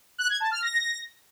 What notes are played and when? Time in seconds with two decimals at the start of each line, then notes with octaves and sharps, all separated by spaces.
0.18 F#6
0.29 G#6
0.40 A5
0.51 F6
0.62 A#6